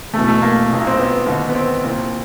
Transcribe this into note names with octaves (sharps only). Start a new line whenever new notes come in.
E2 B2 A3
A3
A#3
B1 A#2
C4
B3
D#2 D3
B3
C4
C2 A#2